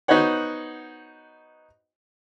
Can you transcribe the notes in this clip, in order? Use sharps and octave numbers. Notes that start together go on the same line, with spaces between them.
B3 D#4 F#4 C5 C#5 F#5